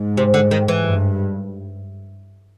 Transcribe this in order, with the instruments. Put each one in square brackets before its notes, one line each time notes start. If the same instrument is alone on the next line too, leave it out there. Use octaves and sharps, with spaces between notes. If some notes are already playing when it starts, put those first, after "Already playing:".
Already playing: [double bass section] G#2
[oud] C3
D3
D#3
E3
[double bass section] G2